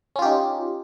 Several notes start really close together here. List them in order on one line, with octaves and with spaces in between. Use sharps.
C#4 F4 G4 D#4